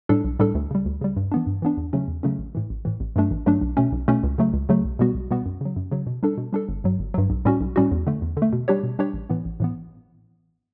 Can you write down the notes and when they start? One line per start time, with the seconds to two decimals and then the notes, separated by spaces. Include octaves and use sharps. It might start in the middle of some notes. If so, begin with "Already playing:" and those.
0.09 A2 G3 D4 A4
0.24 B1
0.40 A2 G3 D4 A4
0.55 D2
0.71 C#3 G3
0.86 D2
1.01 C#3 G3
1.16 G2
1.32 E3 B3 D4
1.47 G2
1.62 E3 B3 D4
1.77 E2
1.93 C#3 F#3 A3 C#4
2.08 E2
2.23 C#3 F#3 A3 C#4
2.39 A1
2.55 A2 E3
2.70 A1
2.85 A2 E3
3.00 A1
3.16 G2 F#3 A3 D4
3.31 A1
3.46 G2 F#3 A3 D4
3.61 B1
3.77 B2 A3 C#4
3.92 B1
4.08 B2 A3 C#4
4.23 C#2
4.38 C#3 F#3 A3
4.53 C#2
4.69 C#3 F#3 A3
4.85 B1
4.99 B2 G3 B3 F#4
5.15 B1
5.31 B2 G3 B3 F#4
5.46 F#2
5.61 C#3 F#3
5.76 F#2
5.92 C#3 F#3
6.07 B2
6.23 G3 D4 A4
6.38 B2
6.53 G3 D4 A4
6.69 G1
6.84 G2 F#3
6.99 G1
7.14 G2 F#3
7.30 B1
7.45 A2 G3 C#4 F#4
7.61 B1
7.76 A2 G3 C#4 F#4
7.91 E2
8.07 D3 A3
8.22 E2
8.37 D3
8.42 A3
8.53 B2
8.68 G3 D4 G4 C#5
8.83 B2
8.99 G3 D4 G4 C#5
9.14 A1
9.30 A2 E3 B3
9.45 A1
9.60 A2 E3 B3